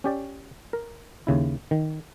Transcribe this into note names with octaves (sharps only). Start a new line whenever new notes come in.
C#4 G4 D5
A#4
D#2 C#3 E4
D#3